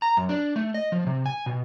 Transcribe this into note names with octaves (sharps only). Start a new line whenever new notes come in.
A#5
F#2
D4
A3
D#5
F3
C3
G#5
B2